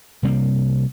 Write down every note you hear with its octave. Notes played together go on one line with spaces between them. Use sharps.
C3 G3 A3 A#3